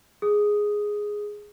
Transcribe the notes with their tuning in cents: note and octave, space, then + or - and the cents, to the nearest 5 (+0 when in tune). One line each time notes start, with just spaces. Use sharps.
G#4 +0 D#6 +0